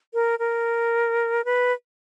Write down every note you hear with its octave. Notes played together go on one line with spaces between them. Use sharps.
A#4
A#4
B4